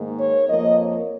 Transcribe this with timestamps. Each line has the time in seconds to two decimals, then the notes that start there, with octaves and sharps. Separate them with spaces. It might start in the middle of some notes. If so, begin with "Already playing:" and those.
Already playing: G#2 D#3 A#3
0.19 C#5
0.49 F2 F3 A#3 D#5
0.79 C#5